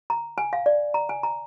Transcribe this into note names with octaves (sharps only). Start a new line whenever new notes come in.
A#5
G#5
F5
D5
A#5
G#5
A#5